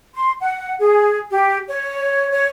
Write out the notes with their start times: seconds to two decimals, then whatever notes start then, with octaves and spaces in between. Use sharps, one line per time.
0.15 C6
0.40 F#5
0.79 G#4
1.30 G4
1.67 C#5
2.31 C#5